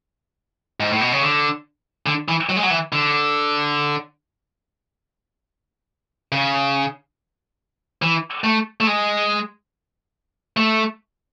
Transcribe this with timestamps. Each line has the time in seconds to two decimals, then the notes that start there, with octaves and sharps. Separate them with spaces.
0.80 G#2
0.91 A2
1.01 B2
1.12 C#3
1.22 D3
2.06 D3
2.28 E3
2.49 F#3
2.57 G#3
2.63 F#3
2.71 E3
2.93 D3
6.32 C#3
8.02 E3
8.44 A3
8.81 A3
8.87 G#3
10.57 A3